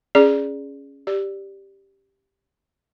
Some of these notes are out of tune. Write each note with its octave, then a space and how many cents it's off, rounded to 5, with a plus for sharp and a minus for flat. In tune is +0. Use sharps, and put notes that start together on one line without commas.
C#4 +0 G#4 +0 D5 +0
G4 +0 D5 +0